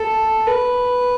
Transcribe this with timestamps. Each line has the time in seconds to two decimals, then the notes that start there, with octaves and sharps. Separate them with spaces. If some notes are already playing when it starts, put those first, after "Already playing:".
Already playing: A4
0.47 B4